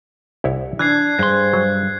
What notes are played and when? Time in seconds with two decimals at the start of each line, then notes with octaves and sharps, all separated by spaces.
0.44 C2 E4 C#5
0.79 E3 D4 F#6 G#6 C7
1.19 G2 G#4 C5 C6
1.53 F#3